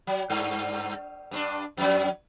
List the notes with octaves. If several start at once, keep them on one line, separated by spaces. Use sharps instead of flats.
F#3
G2
G2 B3 D4
F2 F#3